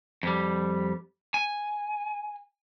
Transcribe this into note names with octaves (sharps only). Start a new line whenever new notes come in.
F2 G3
G#5